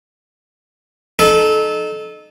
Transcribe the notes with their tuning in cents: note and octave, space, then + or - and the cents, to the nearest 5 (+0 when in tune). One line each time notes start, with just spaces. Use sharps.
D#4 -25 A4 -25